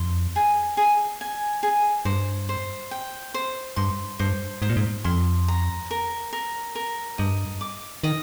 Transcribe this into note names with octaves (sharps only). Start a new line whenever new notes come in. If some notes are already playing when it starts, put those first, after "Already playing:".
Already playing: F2 C6
G#4
G#4
G#5
G#4
G2 C5
C5
G5
C5
G2 C6
G2 C5
G#2 C5
A#2
G#2
F2 C6
A#5
A#4
A#4
A#4
G2 D#5
D6
D#3 D#5